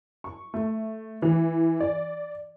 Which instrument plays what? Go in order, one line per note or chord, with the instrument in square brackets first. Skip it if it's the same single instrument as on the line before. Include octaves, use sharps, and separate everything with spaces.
[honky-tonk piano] C#6
A3
E3
D5